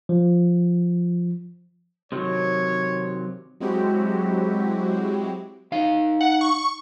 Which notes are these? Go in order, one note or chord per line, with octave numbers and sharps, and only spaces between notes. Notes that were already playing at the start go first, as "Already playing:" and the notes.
F3
C3 D#3 F#3 C#5
F#3 G#3 C4 E4 F#4 G4
D#4 F5
F#5
C#6